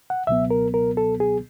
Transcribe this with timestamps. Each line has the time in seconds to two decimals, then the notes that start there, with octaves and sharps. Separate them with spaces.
0.10 F#5
0.27 C#2 B2 F#3 B3 E5
0.51 A#4
0.74 A#4
0.97 A4
1.20 G#4